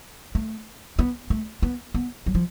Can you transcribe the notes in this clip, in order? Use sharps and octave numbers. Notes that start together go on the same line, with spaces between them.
A3
B3
A3
B3
B3
F#3
F3